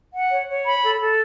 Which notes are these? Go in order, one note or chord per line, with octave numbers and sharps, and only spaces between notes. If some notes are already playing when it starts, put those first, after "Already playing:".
F#5
C#5
C#5
B5
A4
A4